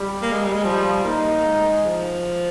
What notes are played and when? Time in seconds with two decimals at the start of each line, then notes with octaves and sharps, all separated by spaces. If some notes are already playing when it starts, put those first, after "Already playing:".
Already playing: G3
0.22 A#3
0.32 G#3
0.43 G3
0.53 G#3
0.63 F3 G3
1.04 A#3 D#4
1.38 A#3
1.45 G#3
1.85 F3